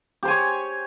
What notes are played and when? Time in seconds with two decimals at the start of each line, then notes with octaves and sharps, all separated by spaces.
0.23 G4
0.25 C5
0.28 G#5
0.30 C#5